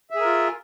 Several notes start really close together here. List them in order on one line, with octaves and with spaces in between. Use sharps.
E5 G#4 A#4 F4